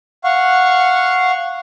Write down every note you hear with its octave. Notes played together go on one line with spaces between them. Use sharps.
F5 F#5 C#6